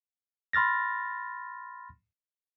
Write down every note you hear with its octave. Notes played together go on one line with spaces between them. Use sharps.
B5 C6 F6 A6 A#6